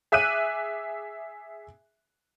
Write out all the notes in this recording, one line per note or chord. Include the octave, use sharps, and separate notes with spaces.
G#4 E5 D6 F#6 D#7